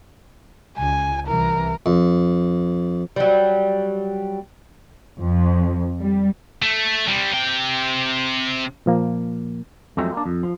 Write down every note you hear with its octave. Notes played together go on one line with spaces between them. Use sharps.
C#2 G#5
C2 E3 A#4
F2
F#3 G3
F2
G3
A3
C3 G3
C3 G5
A#2 F3 A#3
F2 F#3 G#3 A3 C4
A#3 D4
F2
F3